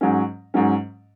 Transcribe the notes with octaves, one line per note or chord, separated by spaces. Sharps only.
G#2 F#3 C#4
G#2 F#3 C#4